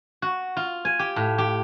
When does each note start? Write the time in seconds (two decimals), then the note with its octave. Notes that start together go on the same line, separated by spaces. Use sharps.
0.22 F#4
0.57 F4
0.85 G#5
0.99 G4
1.16 A2
1.38 G4